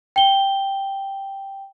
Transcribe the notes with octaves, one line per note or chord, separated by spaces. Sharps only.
G5 G7